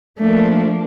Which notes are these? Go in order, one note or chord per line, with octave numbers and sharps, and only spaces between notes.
F3 A3 A#3 D4